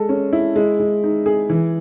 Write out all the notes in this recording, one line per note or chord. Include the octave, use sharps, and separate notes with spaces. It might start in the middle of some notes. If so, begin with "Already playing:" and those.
Already playing: G#3 A4
C#4
E4
G#3
G#3
D#4
G#4
E3